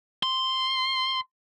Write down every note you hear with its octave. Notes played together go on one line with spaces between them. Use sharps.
C6